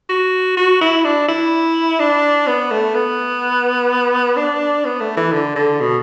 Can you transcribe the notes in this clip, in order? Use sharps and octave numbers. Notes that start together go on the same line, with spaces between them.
F#4
F#4
E4
D4
E4
D4
B3
A3
B3
D4
B3
A3
E3
D3
D3
B2